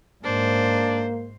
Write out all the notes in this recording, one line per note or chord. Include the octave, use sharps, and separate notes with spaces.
G#2 A#3 D4 C5